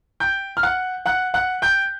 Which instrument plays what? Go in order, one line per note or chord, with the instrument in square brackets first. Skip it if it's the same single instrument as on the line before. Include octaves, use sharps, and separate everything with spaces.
[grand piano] G5 G6
F6
F#5 F#6
F#5 F#6
F#5 F#6
G5 G6